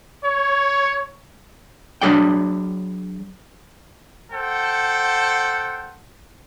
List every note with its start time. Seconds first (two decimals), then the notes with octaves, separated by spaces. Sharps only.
0.24 C#5
2.02 F#3 D4 G#4 D5 G5
4.31 A4 C5 F#5 G5